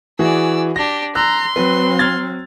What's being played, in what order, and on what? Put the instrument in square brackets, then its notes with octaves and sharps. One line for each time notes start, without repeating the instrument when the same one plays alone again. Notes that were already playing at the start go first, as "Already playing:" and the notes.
[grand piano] E3 F#4 G#4 [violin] D5 E6
[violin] D4 G4 [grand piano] A#6
[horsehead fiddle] A#5 [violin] C6 [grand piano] E6 F#6
[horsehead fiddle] F#3 C4 [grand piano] B4
[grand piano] F6 G#6 A6